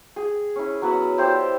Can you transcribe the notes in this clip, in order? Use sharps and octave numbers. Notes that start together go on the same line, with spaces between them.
G#4
C#4 E4
F#3 B3 B5 E6
E4 G4 C5 D5